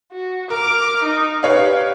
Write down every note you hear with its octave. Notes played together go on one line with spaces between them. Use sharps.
F#4
A#4 D6 F6
D#4
G4 B4 C#5 F5